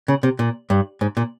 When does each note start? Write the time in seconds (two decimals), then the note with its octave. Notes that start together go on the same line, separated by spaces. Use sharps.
0.08 C#3
0.23 C3
0.39 A#2
0.70 G2
1.01 G#2
1.17 A#2